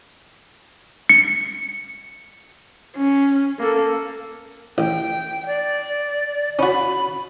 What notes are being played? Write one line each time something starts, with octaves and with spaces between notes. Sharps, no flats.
C#7
C#4
A#3 A4
A1 G5
D5
C#4 F#4 B5